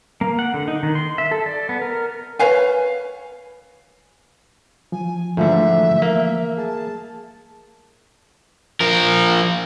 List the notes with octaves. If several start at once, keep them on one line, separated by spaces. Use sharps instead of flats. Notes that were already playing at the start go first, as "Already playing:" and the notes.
A#3
F#5
D3
D#4
D#3
C6
E5
A4
D5
B3
A#4
B4 C#5 F5 G#5
F3 G#5
G#2 D3 E3 F3 A3 E5
A#3
G#4 A5
F3 A#4